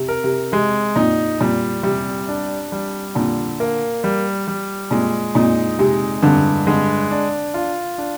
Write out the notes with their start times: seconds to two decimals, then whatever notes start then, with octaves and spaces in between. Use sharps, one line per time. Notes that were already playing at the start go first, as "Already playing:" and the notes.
Already playing: C3
0.08 A#4
0.24 C3
0.52 C3 G#3
0.96 A#2 D#4
1.41 A#2 G3
1.83 C3 G3
2.28 D4
2.72 G3
3.15 A#2 D3
3.60 A#3
4.04 G3
4.48 G3
4.91 A#2 G#3
5.35 A#2 D#4
5.79 C3 G#3
6.22 G2 D3
6.67 D3 G#3
7.11 D4
7.54 F4
7.98 D4